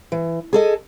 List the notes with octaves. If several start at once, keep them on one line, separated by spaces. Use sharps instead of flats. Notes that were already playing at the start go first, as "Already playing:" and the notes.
E3
G#4 A4 D#5